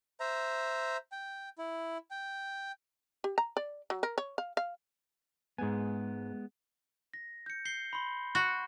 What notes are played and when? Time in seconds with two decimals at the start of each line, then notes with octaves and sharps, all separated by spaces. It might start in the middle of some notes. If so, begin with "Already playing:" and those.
0.20 C5 E5 A#5
1.12 G5
1.58 E4
2.11 G5
3.24 G4
3.38 A#5
3.57 D5
3.90 F#3
4.03 A#4
4.18 C#5
4.38 F5
4.57 F5
5.58 G#2 G#3 B3 G#5
7.14 A#6
7.46 G6 C#7
7.65 G6 C7 G7
7.93 B5 C6
8.35 F#4